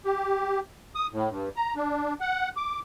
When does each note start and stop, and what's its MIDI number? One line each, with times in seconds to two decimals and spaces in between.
0.05 0.60 67
0.95 1.07 87
1.13 1.29 45
1.29 1.49 43
1.56 1.74 82
1.76 2.14 62
2.21 2.49 78
2.57 2.79 86